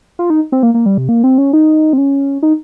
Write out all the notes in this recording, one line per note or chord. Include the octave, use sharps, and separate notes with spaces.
F4
D#4
C4
A#3
A#3
G3
C3
A#3
C4
C#4
D#4
C4
C#4
D#4